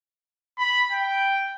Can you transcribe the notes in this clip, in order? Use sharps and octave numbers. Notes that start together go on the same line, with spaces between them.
B5
G5